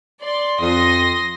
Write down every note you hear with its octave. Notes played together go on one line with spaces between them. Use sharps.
D5 C6
F2 C6 D#6 A#6